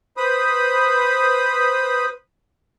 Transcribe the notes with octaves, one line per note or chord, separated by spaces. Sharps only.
B4 C5 B5 D#6